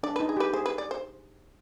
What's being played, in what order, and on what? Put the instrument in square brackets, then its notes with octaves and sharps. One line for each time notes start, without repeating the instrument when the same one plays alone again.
[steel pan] D4 [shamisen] D5
[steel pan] D#4 [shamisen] B4
[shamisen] G#4
[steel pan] G4 [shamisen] B4
[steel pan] G#4 [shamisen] C5
[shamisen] B4
D5
C5